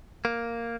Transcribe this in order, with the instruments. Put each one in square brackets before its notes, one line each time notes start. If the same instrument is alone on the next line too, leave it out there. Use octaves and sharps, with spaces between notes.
[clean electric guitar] A#3